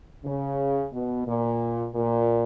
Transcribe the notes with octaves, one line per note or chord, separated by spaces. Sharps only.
C#3
B2
A#2
A#2